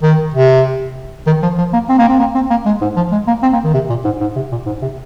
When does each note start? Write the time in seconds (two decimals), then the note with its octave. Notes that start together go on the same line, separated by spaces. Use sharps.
0.03 D#3
0.34 C3
1.26 D#3
1.42 F3
1.58 F3
1.73 A#3
1.89 C4
1.99 A#3
2.09 C4
2.19 A#3
2.35 C4
2.50 A#3
2.66 G#3
2.81 G#2
2.96 F3
3.12 G#3
3.27 A#3
3.42 C4
3.53 A#3
3.64 D#3
3.74 C3
3.89 A#2
4.04 G#2
4.21 G#2
4.36 C3
4.51 A#2
4.66 G#2
4.82 C3